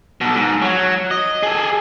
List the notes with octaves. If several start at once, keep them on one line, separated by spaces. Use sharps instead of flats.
B2 A4
G#2
F#3
D#5
G#4 A4